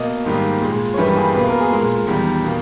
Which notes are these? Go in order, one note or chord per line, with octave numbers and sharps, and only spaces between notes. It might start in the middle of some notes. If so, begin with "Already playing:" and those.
Already playing: B2 A#3 D#5
G#2 D#3 G3 A#3
A#2 G#3
C#5
G2 E3 G3 A#3 B4
G#4
B2 A#3 B4
A#4
G#4
A#2 G#3 A#4
E2 D#3 G3
B2 A#3